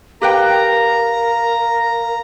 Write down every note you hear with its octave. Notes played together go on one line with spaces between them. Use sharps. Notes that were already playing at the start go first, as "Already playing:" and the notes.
G4 A#4 B4 F5 G5 A#5